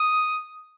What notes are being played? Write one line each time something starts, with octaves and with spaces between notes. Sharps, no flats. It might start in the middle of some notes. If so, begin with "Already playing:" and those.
Already playing: D#6